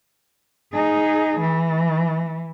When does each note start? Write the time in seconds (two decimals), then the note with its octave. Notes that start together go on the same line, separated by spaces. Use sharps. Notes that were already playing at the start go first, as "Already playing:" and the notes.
0.72 D#4 G#4
1.40 E3